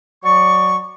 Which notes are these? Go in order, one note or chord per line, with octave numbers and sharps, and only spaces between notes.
F#3 D5 C#6